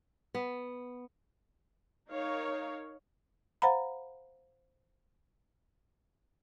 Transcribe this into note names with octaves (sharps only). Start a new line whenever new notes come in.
B3
D#4 A#4 C#5 F5
C5 F5 F#5 A#5 B5